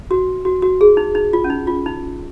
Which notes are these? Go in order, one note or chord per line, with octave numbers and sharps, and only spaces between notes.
F#4
F#4
F#4
G#4
D#4
D#4
F4
C#4
D#4
F4
D#4